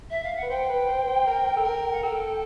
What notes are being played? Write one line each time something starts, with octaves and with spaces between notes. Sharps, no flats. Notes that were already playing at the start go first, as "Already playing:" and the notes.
E5
F5
F#5
B4
C5 G5
B4
C5
B4
C5
A#4
A4
A#4
F#5
A4 G5